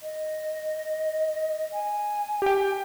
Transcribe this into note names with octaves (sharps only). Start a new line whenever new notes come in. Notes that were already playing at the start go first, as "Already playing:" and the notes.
D#5
G#5
G4 G5